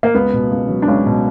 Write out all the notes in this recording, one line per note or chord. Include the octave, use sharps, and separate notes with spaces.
A#3
C#2 B3
B2
C#2
F#3
D4
C#2 C#4
B2